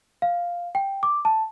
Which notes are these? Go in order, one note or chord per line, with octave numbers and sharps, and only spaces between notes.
F5
G5
D6
A5